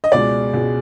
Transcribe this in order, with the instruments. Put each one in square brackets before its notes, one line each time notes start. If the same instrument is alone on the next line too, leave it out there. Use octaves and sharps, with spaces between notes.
[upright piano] D#5
C#2 B2 G#3 D5
C#2 B2 G#3